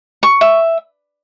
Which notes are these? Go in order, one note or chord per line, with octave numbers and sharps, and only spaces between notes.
C#6
E5